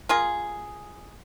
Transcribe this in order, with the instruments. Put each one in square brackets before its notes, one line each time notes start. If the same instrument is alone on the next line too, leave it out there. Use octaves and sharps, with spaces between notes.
[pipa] A#3 F4 G#4